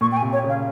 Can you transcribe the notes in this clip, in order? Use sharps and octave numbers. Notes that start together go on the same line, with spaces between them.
A#2 C#6
G5
G#5
C3
C#5
C#3
F5